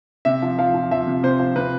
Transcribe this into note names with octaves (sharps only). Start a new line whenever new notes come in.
C3 E5
F3
F3 F5
F3
F3 E5
C3
C3 C5
F3
C3 B4